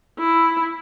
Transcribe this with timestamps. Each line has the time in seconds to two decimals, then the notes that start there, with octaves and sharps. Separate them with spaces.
0.19 E4